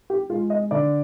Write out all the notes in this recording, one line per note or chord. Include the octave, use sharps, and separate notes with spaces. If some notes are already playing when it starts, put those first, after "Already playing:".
G4
G#3 F4
D#5
D3 D5